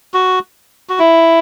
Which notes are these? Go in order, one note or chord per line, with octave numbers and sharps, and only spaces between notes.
F#4
F#4
E4